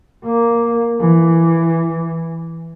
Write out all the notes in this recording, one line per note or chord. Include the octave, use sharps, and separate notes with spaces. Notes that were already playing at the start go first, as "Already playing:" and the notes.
A#3
E3